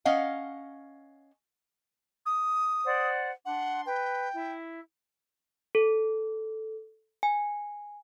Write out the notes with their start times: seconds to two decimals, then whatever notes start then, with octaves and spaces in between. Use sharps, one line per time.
0.05 C#4 D#5 F5 F#5
2.26 D#6
2.85 C5 D5 F#5
3.45 D4 F#5 C6
3.86 B4 G5
4.34 E4
5.75 A4
7.23 G#5